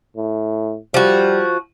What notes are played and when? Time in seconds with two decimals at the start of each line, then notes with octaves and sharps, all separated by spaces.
0.16 A2
0.94 F3 G3 F#4